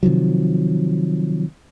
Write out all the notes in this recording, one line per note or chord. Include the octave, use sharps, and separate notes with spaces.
C3 D#3 F3 F#3